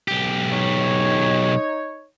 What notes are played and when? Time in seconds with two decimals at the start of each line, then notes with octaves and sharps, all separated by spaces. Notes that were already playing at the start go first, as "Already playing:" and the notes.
0.08 B1 G4
0.52 D#4 C#5